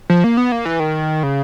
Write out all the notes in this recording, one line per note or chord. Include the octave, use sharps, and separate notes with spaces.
F3
A#3
B3
A#3
E3
D#3
C#3